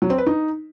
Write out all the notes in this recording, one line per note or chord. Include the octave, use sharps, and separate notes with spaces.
F#3
C4
B4
D#4